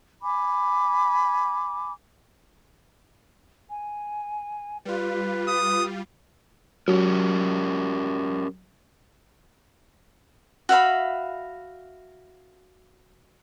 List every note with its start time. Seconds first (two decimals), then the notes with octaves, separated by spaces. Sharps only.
0.22 G#5 B5 D6
3.70 G#5
4.85 G3 F4 B4
5.48 D#6
6.88 F#3 C#4 G4 A#4
10.69 F#4 E5 F5 B5